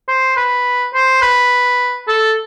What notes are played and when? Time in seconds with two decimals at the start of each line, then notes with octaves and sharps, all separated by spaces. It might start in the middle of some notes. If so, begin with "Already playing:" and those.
0.08 C5
0.37 B4
0.94 C5
1.22 B4
2.08 A4